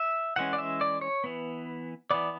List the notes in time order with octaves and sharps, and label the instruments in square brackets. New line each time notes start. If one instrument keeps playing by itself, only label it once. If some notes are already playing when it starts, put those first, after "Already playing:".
Already playing: [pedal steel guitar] E5
E3 G#3 C#4 F#5
D5
E5
D5
C#5
E3 B3
E3 B3 D5